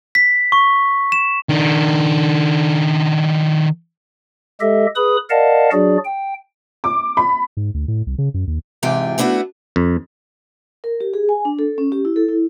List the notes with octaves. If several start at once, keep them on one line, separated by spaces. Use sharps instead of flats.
B6
C#6
E7
D#3 D4
G#3 G4 A4 D#5 E5
G#4 B4 B5 D#6
A#4 D5 D#5 F5 F#5 A5
F#3 D4 F#4 G#4 D5
G5
D6
B5
G#2
D2
A2
C2
C#3
F#2
D#2
G#2 C3 E3 F4 G5 G#5
A3 B3 D4 E4 F#4
F2
A#4
G4
G#4
G#5
D4
A4
C#4
G4
E4
A4
E4